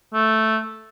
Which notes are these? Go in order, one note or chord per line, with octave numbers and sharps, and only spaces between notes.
A3